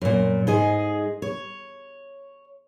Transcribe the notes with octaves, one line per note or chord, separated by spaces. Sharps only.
F#2 A#2
G#2 G#4 D#5
C#5